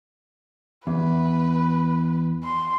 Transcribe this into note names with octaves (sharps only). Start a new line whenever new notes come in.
E2 B4
C6